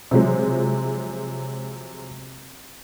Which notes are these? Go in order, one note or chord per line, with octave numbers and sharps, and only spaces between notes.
C3 F3 F#3 G#3